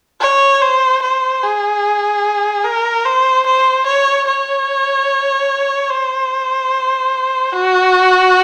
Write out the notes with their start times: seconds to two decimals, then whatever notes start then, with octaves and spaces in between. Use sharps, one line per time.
0.21 C#5
0.62 C5
1.02 C5
1.44 G#4
2.65 A#4
3.06 C5
3.46 C5
3.86 C#5
4.28 C#5
5.90 C5
7.52 F#4